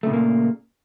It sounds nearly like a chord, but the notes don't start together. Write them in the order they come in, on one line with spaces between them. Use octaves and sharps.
A3 C#3 A#2 A#3